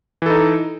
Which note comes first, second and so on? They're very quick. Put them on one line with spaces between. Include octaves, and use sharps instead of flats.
E3 A4 D#4